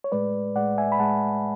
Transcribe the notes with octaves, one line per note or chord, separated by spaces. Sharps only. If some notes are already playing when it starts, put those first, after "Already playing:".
C#5
A2 G#3 B4 D5
A2 G#3 D5 F#5
E5 G#5
B5
A2 G#3 F#5 A5